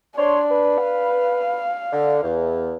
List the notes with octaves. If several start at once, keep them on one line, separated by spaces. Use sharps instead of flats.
D4 C#5 D5 C6
B4
F5
D3
E2